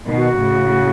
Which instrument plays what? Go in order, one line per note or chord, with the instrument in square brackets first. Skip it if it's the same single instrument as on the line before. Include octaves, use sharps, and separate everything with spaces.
[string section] B2 D#3
[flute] F#4
[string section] A2 C#3